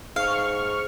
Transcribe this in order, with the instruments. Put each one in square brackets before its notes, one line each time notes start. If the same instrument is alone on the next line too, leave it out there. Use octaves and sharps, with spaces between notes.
[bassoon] G#2 [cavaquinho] F5 [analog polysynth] C#6 F6